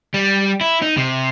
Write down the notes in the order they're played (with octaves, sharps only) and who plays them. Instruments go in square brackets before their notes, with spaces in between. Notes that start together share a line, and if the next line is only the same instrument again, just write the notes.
[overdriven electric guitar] G3
E4
D#4
C3